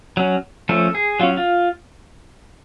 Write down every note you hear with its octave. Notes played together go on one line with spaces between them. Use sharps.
F#3 C#4
F3 A3 C#4 A4
G#4
F#3 C#4 F4
F4